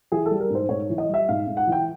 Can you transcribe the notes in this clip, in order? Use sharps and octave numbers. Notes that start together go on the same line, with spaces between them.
E3 G#4
A4
G3
A#4
G#2 C5
G#2 C#5
E3
D#5
G3 E5
G#2 F5
G#2
F#5
E3
G5